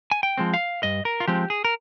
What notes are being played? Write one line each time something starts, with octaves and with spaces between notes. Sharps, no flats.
G#5
G5
F3 G#3 C4
F5
G2 D#5
A#4
F4
F3 G#3 C4 G4
G#4
A#4